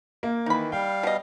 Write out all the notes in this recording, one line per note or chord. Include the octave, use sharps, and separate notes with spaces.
A#3
D#3 E3 D#4 B5
G3 F5 G5
B2 D#5